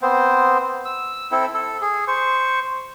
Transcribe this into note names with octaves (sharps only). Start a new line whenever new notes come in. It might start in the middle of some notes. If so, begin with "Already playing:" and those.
B3 C4 C5
E6
C4 E4 A4
A4
G#4
C5 C#6